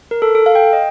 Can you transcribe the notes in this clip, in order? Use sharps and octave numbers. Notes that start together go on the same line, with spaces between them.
A#4
A4
A4
F5
G5
D#5